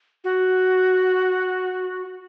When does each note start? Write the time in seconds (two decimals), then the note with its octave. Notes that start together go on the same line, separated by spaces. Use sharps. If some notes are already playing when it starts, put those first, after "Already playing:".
0.24 F#4